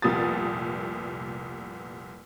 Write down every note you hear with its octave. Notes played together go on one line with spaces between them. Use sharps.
F1 C2 A#2 B3 D#6 A6